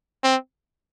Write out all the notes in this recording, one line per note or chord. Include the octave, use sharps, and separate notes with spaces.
C4